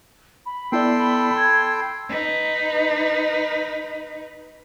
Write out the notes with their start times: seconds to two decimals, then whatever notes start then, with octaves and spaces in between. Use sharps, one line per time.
0.45 B5
0.72 B3 E4 A4 D5 G5 C6
1.36 B5 G#6
2.09 D#4 B4